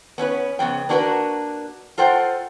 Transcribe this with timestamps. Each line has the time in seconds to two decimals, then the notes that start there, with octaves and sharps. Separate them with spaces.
0.18 B3 C#4 D4 B4
0.59 F2 C#3 B3 G5
0.89 A#3 D4 F#4 G4 A#4 B4
1.98 F4 A4 C5 F#5 G5